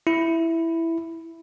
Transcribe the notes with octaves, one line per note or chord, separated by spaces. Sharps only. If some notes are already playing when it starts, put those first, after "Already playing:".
E4